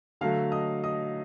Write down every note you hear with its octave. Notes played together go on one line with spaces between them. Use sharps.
D3 F#3 A3 F5 F6
D#5 D#6
D#5 D#6